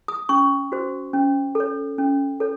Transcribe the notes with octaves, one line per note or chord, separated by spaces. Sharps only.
D#6
C#4 C#6
F#4 C5
C#4
A4 C#5
C#4
A4 C#5